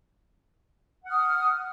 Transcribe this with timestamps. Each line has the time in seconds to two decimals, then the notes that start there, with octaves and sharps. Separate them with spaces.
1.05 F#5
1.08 F6
1.10 D#6